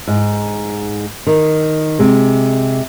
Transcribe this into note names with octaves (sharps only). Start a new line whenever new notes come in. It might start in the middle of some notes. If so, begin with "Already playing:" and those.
G#2
D#3
C3 G#3